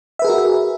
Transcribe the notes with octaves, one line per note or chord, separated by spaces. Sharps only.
F#4 G#4 A#4 B4 E5